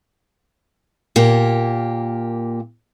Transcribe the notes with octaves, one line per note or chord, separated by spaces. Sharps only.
A#2 A#3 G4